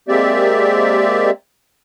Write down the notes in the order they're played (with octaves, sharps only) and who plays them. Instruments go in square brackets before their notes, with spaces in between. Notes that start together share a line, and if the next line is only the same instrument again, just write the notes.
[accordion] G#3 A#3 C4 G4 D5 E5